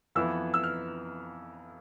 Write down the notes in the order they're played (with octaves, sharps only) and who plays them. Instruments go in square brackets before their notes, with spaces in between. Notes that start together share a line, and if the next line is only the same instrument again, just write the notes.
[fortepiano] F2 E3 B3 E4 [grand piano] E6
[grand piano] E6
F6